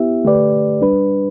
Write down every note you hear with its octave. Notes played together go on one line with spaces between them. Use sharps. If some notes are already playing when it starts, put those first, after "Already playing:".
Already playing: B3 E4 G4 E5
D3 A3 G4 B4 D5
G3 D4 B4